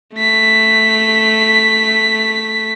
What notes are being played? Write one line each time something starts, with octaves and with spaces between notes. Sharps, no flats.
A3 B6